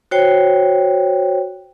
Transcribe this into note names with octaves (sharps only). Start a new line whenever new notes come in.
F#4 C5 C#5 G5